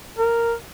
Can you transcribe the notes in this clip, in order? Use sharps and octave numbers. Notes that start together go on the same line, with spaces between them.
A#4